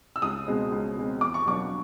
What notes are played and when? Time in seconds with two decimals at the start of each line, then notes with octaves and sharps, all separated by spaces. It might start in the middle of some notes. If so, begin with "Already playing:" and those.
0.16 E6
0.22 C#2 D#6
0.47 B2 G#3 C4
0.72 C#2
0.96 B2 G#3 C4
1.21 E2 D6
1.34 C#6
1.46 B2 F#3 A#3 D4 D6